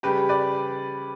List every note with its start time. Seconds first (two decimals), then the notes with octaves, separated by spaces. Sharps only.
0.03 C#3 G3 G4 B4
0.29 B4 D5